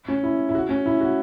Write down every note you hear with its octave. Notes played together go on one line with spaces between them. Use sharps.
C#4
E4
E4
F#4
C#4
E4
F#4